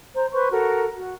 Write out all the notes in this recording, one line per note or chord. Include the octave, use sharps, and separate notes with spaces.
C5 A#5
B4 C5 C6 C#6
F#4 A4 A#4
F#4